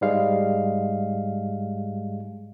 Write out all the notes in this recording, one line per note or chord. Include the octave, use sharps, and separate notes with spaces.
G#2 G3 G#3 F5